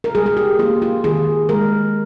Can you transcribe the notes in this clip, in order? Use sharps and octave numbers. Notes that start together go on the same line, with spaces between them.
A#4
G3 G#4
G#4
G4
A#3 F4
F4
D#3 G#4
G#3 A#4